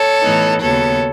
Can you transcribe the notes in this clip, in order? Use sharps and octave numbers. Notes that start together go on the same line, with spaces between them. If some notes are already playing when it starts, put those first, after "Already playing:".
Already playing: A4 C#5
A2 E3 B3 D#4
D#2 C#3 F#3 B3 A4 C#5